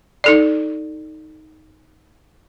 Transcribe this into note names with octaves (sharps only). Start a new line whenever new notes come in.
D#4 A4 D5